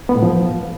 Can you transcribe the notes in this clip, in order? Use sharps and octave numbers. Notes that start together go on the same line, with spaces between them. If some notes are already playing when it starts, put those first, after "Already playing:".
B3
A2
F3